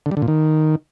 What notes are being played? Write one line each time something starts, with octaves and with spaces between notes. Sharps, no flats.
D3
G3
D3
A#2
D#3